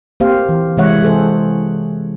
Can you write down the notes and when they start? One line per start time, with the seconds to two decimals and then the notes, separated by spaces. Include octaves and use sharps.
0.20 A#3 C4 G4 C5 F5
0.49 E3
0.77 C3 E3 G#3 C#5 E5 F#5
1.02 E3 G#4 A4 C5